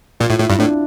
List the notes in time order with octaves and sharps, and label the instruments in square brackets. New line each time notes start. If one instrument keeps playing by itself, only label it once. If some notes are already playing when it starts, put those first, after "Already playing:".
[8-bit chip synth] A#2 [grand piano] F4
[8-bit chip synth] A2
[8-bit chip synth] A2 [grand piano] E4
[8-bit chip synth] G2
[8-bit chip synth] A2 [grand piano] D4